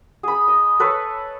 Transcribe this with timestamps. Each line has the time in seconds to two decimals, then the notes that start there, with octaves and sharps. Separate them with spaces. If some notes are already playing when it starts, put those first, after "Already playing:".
0.23 G#4 B5
0.48 D#5
0.80 A4 B4 C#5